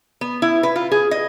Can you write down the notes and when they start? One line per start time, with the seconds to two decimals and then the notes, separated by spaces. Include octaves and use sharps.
0.21 B3
0.42 E4
0.63 B4
0.76 F4
0.91 G#4
1.11 D#5